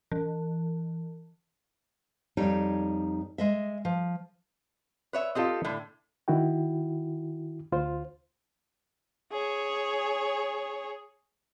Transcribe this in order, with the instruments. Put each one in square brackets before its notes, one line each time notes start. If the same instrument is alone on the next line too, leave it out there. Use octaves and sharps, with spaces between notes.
[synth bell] E3
[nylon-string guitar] F2 G3 D#4 C#5
G#3 D#5 E5
F3
[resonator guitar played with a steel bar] B4 C#5 E5
[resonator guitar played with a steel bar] C4 G4 A4 [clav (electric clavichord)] F4 D#5
[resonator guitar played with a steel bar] A2 D3
[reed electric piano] D#3 E4 F#4 G5
D2 F4 C5
[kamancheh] G#4 C#5